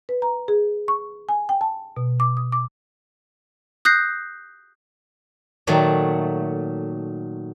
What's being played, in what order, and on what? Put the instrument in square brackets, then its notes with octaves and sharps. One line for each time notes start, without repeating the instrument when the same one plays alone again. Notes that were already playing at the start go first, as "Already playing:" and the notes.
[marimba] B4
A#5
G#4
C#6
G#5
G5
A5
B2
D6
D#6
D6
[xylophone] D#6 F#6 G6 A#6 C7
[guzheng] A#2 D#3 F#3 A3